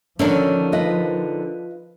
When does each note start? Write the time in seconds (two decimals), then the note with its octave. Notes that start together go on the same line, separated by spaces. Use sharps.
0.19 D3 D#3 F3 C#4 D4
0.72 F4 B4 D#5